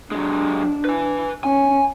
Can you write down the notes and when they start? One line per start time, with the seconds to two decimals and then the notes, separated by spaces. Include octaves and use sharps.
0.12 F#3 G#3 D4
0.85 B4 G#5
1.44 C#4 G#5